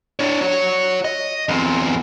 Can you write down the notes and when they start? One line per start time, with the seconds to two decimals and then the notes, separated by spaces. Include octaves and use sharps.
0.20 D4 C#5
0.41 F#4 C#5
1.05 D#5
1.49 E2 C4